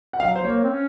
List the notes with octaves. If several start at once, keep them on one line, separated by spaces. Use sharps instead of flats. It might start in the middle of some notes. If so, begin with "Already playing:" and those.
F#5
F#3 F5
C5
A#3 C#5
C4
C#4